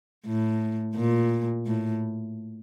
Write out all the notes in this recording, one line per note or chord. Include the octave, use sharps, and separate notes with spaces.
A2
A#2
A2